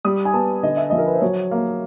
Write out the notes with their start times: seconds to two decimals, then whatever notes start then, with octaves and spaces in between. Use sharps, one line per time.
0.05 G3 D#6
0.25 G#5
0.34 B3 A5
0.63 D3 D#5
0.77 E5
0.90 F3 D#5
0.98 A#4
1.07 B4
1.14 C5
1.21 F#3 C#5
1.51 A#3